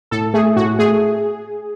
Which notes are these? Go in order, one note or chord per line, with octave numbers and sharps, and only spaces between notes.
A2 A4
A3 G#4
A2 F#4
A3 G#4